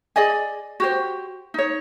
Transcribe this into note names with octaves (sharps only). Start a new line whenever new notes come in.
G#4 D5 D#5 G#5
F#4 G4 C5
D#4 C#5